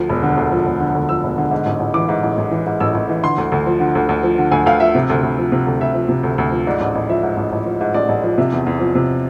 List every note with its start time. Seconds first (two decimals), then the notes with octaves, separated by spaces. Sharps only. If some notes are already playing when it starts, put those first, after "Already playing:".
Already playing: D2 F3
0.09 E1
0.23 D3
0.37 D2
0.52 F3
0.66 E1
0.80 D3
0.95 D2
1.09 F3 E6
1.24 E1
1.38 D3
1.51 G#2
1.66 A1
1.80 A1
1.94 E3 D6
2.09 G#2
2.23 A1
2.38 A1
2.51 E3
2.66 G#2
2.80 A1 E6
2.95 A1
3.09 E3
3.24 D3 C6
3.38 D2
3.52 D2
3.67 F3
3.80 D3
3.95 D2
4.09 D2
4.23 F3
4.38 D3
4.52 D2 G#5
4.66 D2 F5
4.80 F3 E5
4.95 C3
5.10 D2
5.23 D2
5.38 F3
5.52 C3
5.67 D2
5.81 D2 E5
5.95 F3
6.09 C3
6.23 D2
6.38 D2
6.51 F3
6.67 G#2 D5
6.80 A1
6.95 A1
7.09 F3 E5
7.23 G#2
7.37 A1
7.53 A1
7.66 F3
7.81 G#2
7.94 A1 D5
8.09 A1
8.24 F3
8.38 C3 E5
8.52 E2
8.67 E2
8.80 F3
8.95 C3